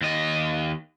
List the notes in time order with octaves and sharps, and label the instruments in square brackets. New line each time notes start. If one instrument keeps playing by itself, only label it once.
[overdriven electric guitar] D#2 D#5